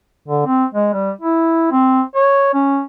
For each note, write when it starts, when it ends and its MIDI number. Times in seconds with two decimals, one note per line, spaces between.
0.28 0.44 50
0.46 0.65 60
0.74 0.89 56
0.93 1.11 55
1.21 1.71 64
1.72 2.01 60
2.15 2.53 73
2.54 2.82 61